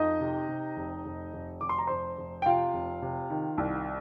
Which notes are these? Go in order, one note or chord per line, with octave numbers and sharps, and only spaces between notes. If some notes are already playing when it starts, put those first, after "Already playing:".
Already playing: F2 D#4 D#5
C3
C3
F1
F1
F1
F1 D6
C6
A#5
F1 C5 C6
F1
G5
C3 F4 F5
F1
C3
D#3
C2